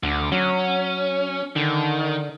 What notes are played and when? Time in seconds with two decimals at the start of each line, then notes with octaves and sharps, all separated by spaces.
0.03 D2 D3
0.32 F#3 C#4
1.56 D3 D#3